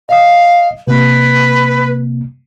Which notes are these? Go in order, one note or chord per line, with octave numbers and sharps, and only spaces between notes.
D#5 F5 D#6
C3 A#3 B4